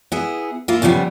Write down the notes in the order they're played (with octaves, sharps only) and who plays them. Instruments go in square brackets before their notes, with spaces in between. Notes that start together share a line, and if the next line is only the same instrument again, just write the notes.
[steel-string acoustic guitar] B3 E4 G#4
A#3 E4 F4
E2 C#3 F3 G3 B3